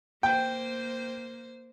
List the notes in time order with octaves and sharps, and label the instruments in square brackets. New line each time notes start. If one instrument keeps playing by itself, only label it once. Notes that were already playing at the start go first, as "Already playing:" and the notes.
[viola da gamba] A#3 C5 [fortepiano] G5